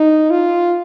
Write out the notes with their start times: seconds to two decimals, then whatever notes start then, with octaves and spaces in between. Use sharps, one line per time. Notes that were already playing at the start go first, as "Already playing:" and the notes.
Already playing: D#4
0.31 F4